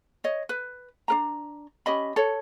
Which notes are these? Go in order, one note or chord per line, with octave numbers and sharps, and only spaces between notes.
C#5 D#5
B4
D4 A#4 A#5
C#4 G4 D#5 B5
A4 C#5